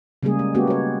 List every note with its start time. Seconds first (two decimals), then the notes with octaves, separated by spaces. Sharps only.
0.23 C#3 G3 G#3 A#3 G#4
0.39 G#3
0.55 G#3 A#3 B3 C#4 F#4 G4
0.67 F#4 C#5